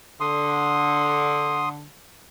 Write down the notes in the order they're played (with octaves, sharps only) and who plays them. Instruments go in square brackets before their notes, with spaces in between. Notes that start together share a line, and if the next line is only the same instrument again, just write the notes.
[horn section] D3 [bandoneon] C6 D#6